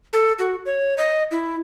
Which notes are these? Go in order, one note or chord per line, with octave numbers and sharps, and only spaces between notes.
A4
F#4
C#5
D#5
E4